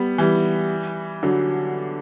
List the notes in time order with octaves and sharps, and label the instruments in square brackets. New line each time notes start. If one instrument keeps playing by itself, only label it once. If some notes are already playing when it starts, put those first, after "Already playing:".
Already playing: [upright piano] G3 B3
E3 G3
D3 F#3